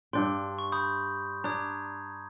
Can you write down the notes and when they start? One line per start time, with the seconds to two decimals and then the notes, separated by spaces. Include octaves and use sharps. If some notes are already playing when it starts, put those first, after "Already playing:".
0.13 G2 D4 G5 C6
0.59 C#6
0.72 B5 D#6 G6
1.44 D4 A#5 D#6 G#6